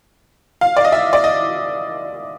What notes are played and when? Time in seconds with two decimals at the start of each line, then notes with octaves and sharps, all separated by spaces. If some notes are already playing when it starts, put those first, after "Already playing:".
0.61 F5
0.77 D5
0.85 D#5
0.92 E5
1.13 D5
1.24 D#5